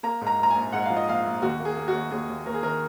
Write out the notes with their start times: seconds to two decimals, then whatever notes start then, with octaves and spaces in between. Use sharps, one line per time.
0.03 A#3 A#5
0.21 G#2
0.27 A#5
0.39 A#1 A#5
0.50 A#1 G#5
0.72 G#2 F#5
0.85 F3 F5
0.96 D#5
1.07 A#1 F5
1.25 A#1
1.42 D#2 F#4
1.60 A#3
1.65 G#4
1.76 A#3
1.88 F#4
1.94 D#2
2.11 D#2 G#4
2.29 D#2
2.46 D#2 A#4
2.54 G#4
2.63 D#3 A#4